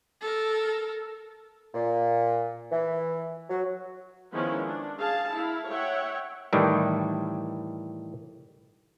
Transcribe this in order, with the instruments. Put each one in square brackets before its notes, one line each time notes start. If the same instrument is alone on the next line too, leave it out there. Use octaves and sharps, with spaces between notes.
[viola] A4 A#4
[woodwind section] A#2
E3
F#3
[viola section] D#3 F3 G#3 B3 C#4 E4
D4
G#4 F5 A5
E4 F5
C#5 E5 F#5 G5
[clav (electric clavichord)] A2 D#3 E3 G3